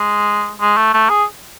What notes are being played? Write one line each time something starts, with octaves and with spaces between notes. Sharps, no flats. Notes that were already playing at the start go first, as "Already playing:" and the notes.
Already playing: G#3
G#3
A3
A3
G#4